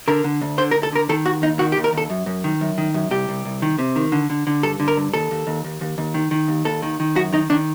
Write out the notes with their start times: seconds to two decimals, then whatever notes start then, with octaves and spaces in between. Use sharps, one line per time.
0.08 D3 A#4
0.24 D3
0.41 D2
0.58 D3 C5
0.71 A#4
0.76 D2
0.83 A4
0.93 D3 A#4
1.09 D#3 A4
1.25 D#2 F#4
1.42 D#2 D#4
1.59 D#3 F#4
1.72 G4
1.77 D#2
1.84 A#4
1.93 D#2 A4
2.10 F#2
2.26 F#2
2.44 D#3
2.61 F#2
2.78 D#3
2.94 F#2
3.11 C2 G4
3.29 C2
3.45 C2
3.62 D#3
3.79 C3
3.96 D#3
4.12 D3
4.30 D3
4.47 D3
4.63 G2 A4
4.80 D3
4.88 A#4
4.97 G2
5.13 D#2 A4
5.31 D#2
5.47 D#2
5.65 D#2
5.81 D#2
5.98 D#2
6.14 D#3
6.31 D#3
6.48 D#2
6.65 D#2 A4
6.82 D#3
7.00 D#3
7.15 F#2 F#4
7.33 D#3 D#4
7.50 D#3 D4